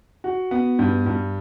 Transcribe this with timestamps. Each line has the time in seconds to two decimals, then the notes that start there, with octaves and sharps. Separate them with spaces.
0.24 F#4
0.51 B3
0.79 G2
1.06 G2